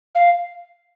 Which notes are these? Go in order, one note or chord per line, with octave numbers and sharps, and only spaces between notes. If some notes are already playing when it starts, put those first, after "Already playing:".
F5